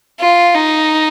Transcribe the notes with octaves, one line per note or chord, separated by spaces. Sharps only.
F4
D#4